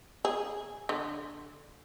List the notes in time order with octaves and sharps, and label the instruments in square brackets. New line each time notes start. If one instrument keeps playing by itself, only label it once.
[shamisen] G#4
D3